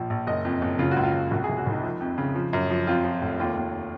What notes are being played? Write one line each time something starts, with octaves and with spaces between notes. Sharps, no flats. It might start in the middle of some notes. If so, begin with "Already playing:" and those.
Already playing: A#1 F3
A#1
F#1 D#5
F2
F#1
C#3 F4
F#4
C#2
F4
C#2
C2 F#4
G#4
C2
F#4
C2 D#4
F3
F2
C#3
F3
F#2
F3
F2 F4
F3
F1
D#2 F4
D#2